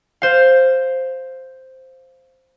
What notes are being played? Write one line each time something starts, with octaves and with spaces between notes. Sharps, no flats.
C5 F5